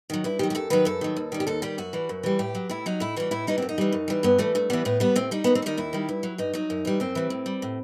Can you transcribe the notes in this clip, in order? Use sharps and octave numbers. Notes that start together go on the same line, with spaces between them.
D#3 F#3
G2 E4
D#3 F#3 G4
G4
F#2 A4
D#3 F#3 B4
F#2 A4
D#3 F#3
D#2
D#3 G3
G4
D#2 A4
D#3 G3 G4
F#2 F#4
E3 G3
F#2
E3 G3
A2 G4
F#3
A2 E4
F#3 D#4
A2 E4
E3 G3 F#4
A2 E4
E3 G3 D#4
F#2 C4
D#4
E3 G3
F#2
E3 G3
G2 B3
E3 G3 A3
G2 A3
E3 G3 B3
A2 B3
G3 B3
A2 C4
G3 D#4
D#2 B3
C4
D#3 G3 D#4
D#2 E4
D#3 G3
G2
F#3
G2 D#4
F#3 D#4
F#2
E3 G3
F#2 C4
E3 G3
A2
G3
A2